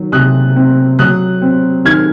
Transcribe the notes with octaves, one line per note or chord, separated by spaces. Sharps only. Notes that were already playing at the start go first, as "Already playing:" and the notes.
Already playing: D#3 F#3
C3 D#6 F#6
C4
F#3 D#6 F#6
C4
D#3 F6 G#6